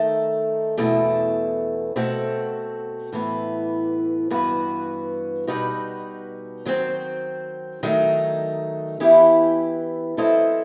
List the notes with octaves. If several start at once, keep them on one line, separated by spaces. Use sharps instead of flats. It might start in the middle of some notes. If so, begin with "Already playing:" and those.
Already playing: D#3 A3 D#4 A4
E2 B2 A3
B2 A3 C4 F#4 A4
A2 E3 B3
G2 E3 B3 F#4 B4
B2 G3 D#4 F#4 B4
D#3 F#3 C4
D#3 F#3 A3 D#4
E3 B3 E4 G4
F#3 C4 E4 A4 D#5